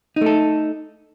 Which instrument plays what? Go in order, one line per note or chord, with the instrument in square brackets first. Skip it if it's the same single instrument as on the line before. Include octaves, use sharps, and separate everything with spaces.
[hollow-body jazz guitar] D#4
A3
A4